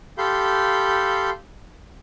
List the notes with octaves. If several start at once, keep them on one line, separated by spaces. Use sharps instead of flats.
G4 A4 F5 B5 C6 G6